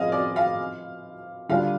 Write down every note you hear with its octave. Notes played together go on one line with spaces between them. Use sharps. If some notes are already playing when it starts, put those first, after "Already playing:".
Already playing: F3 C4 F4 G#4 D#5 F5
D5
F5
D3 G3 D4 F4 F5